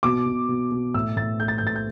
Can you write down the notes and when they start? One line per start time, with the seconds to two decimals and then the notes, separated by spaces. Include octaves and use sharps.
0.03 B2 D6
0.26 B2
0.49 B2
0.71 B2
0.94 A2 E6
1.17 A2 A6
1.40 A3 G6
1.48 A6
1.58 G6
1.63 A2 A6
1.76 G6